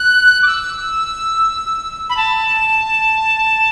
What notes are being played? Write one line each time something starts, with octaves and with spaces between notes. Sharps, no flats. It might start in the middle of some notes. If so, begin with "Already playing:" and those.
Already playing: F#6
D6
E6
B5
A5